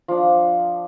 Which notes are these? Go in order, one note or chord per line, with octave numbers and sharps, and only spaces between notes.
F3 D4